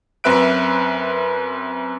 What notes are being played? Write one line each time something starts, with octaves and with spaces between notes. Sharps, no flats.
F#2 C4 B4 E5 F#6 D7